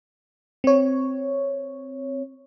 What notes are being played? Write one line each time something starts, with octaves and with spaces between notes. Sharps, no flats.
C4 C#5